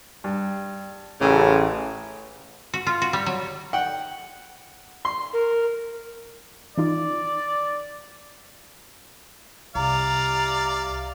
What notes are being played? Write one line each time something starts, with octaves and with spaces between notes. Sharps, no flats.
G2
A1 C#3 G4 A4 G#5
F#4
F4
F#4
G3
F#3
F#5 G5
C6
A#4
E3 D#4 F4 D5
C2 C3 D5 F5 A#5